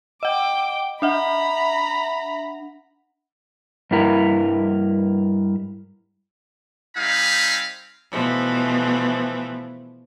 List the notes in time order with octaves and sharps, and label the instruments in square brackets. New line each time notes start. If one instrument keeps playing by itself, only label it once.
[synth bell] D#5 F#5 [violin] G5 D6
[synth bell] D4 E5 F#5 [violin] A#5 B5
[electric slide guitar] G2 G3 E4 A#4
[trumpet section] G3 C4 D#4 F5 G#5 B5
[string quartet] B2 E3 F3 A3